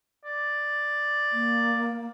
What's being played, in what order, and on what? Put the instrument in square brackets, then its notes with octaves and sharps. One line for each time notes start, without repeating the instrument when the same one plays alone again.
[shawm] D5
[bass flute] A#3